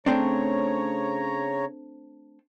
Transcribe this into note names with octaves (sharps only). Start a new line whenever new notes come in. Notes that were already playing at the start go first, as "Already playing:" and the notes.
C#3 A3 C4 D4 C#5 A#5